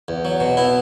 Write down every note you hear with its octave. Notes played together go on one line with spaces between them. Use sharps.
E2
F#3
B2
B3 E4